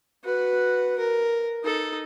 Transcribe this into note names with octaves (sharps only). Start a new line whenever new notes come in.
F#4 B4
A#4
D#4 A4